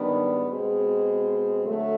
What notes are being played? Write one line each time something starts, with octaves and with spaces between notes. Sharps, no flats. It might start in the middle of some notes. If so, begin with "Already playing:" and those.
Already playing: G#2 D#3 G3 B3 D4
B2 G#3 C4
D3 F#3 A3